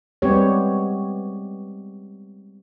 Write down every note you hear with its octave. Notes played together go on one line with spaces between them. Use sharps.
G3 G#3 B3 C4 G4 C#5